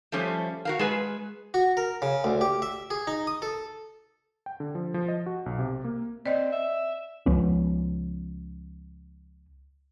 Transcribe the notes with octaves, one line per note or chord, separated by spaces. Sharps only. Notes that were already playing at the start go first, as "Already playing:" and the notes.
F3 G3 A3 C#4 C5
F#4 A#4 F5
G#3 G#4 B4
F#4
A#4
C#3
D2
G4
E5
G#4
D#4
D#6
A4
G5
D3
F3
F3
D#5
F#4
B1
C3
A#3
C4 D5 D#5
E5
C#2 F3 B3 C#4